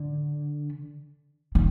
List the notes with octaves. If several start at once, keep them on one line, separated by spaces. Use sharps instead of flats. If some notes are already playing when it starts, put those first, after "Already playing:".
Already playing: D3
D#3